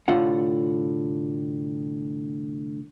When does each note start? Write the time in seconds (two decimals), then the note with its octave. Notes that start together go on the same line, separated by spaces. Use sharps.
0.08 C2 A2 D3 F4 F#5